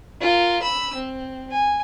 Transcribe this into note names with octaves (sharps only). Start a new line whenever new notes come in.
F4 A#4
B5 E6
C4
G#5